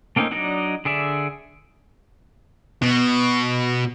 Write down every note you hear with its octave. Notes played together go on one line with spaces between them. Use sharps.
A3 A#3 C4 C#4 D#4
F#3 D4 D#4 D5 D#5
D3 G#4 D5 E5
B2